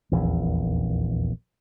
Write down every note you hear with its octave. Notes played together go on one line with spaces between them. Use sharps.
D#1 A#1 E2